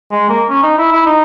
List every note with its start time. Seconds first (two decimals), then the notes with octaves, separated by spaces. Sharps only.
0.11 G#3
0.30 A#3
0.49 C#4
0.63 D#4
0.78 E4
0.92 E4
1.06 D#4